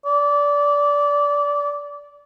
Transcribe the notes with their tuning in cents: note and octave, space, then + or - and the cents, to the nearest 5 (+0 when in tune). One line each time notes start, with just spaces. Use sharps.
D5 -20